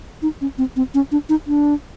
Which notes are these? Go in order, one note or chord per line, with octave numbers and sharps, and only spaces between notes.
D#4
C#4
C4
C4
C#4
D4
D#4
D4